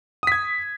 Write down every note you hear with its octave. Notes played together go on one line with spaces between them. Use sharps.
D#6 G#6 B6